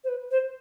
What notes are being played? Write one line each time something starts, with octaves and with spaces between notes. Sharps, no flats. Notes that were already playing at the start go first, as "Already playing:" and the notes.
C5
B4
C5